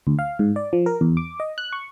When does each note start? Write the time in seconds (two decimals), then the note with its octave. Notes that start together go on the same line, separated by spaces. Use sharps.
0.07 D2
0.19 F5
0.39 G#2
0.56 D5
0.73 F3
0.86 A#4
1.01 E2
1.17 D6
1.40 D#5
1.58 F#6
1.73 C#6